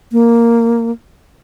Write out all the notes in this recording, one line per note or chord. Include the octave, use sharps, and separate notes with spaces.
A#3